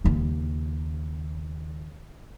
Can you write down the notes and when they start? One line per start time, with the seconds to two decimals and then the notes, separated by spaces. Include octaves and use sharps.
0.04 D#2 C#3